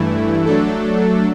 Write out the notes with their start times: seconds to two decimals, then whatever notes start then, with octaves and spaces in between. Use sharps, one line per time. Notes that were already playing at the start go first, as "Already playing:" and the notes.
Already playing: G2 E3 A3 E4
0.46 F#3 A3 D4 A4